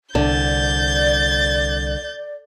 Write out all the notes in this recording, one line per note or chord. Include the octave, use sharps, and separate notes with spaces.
C2 D3 D5 G6 A6